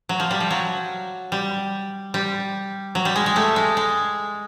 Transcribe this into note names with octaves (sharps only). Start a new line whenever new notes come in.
F#3
F3
G3
F3
F#3
G3
G3
F#3
G3
G#3
G#3
G3 A3
G#3
G#3